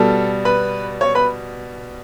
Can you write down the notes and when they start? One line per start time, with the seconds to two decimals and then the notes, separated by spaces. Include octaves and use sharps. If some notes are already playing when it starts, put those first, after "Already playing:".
Already playing: B2 G3 A4 A5
0.45 B4 B5
1.01 C#5 C#6
1.15 B4 B5